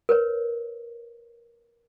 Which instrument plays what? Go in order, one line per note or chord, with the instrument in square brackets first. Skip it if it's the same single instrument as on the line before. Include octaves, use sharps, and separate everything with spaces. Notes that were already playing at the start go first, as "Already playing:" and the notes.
[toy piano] A#4 B4 C#5